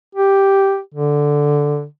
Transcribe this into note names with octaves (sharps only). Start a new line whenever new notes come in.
G4
D3